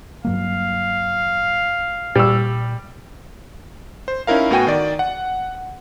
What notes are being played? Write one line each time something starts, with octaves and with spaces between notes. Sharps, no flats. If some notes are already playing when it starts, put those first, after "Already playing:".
G2 F#3 A#3 F5
A#2 G3 E6
C5
C#4 D#4 E4 A#4 F5
A2 B3 F#4 G5 G#5 D#7
D#3 D5
F#5